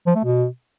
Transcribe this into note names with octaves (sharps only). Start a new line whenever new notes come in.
F3
A3
B2